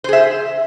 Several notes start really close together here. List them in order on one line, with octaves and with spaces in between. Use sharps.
C5 G#4 E5